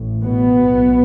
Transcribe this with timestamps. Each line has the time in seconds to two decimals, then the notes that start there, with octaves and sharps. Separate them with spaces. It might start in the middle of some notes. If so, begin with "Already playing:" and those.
Already playing: A1 A2
0.22 B2 B3
0.59 B1 B2